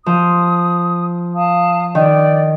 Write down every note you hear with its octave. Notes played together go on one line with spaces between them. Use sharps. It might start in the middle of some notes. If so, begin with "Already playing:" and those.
F3 D#6
F5 A5 D#6
D#3 D5